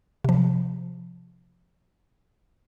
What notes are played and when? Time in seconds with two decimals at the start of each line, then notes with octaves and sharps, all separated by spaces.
0.24 C3 F3